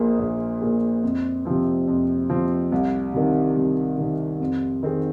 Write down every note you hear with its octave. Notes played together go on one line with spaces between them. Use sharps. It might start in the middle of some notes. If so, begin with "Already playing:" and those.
Already playing: A#1 A#2 A#3 G#4
A#1
A#2 A#3 G#4
F2
C3 F3 C4
F2
C3 F3 C4
C2
C3 D#3
C2
C3 D#3
F2
D#3 C4 D#4 G#4